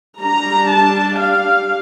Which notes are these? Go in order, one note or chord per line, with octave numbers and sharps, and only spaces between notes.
G3 D4 A#5
A5
F5